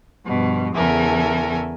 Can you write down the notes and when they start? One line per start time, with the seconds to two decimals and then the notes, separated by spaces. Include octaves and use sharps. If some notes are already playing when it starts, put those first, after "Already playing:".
0.25 G2 B2 F3
0.75 E2 C#3 A4 A#4 E5 G#5